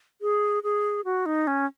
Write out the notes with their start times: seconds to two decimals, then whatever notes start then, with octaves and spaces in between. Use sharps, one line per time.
0.22 G#4
0.63 G#4
1.05 F#4
1.26 D#4
1.47 C#4